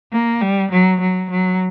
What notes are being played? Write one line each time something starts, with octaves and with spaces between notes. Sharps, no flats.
A#3
G3
F#3
F#3
F#3